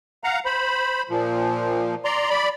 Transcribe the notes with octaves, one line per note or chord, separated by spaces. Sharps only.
F5 F#5 A#5
C5 B5
A#2 F3
D5 A#5 C6
D5 B5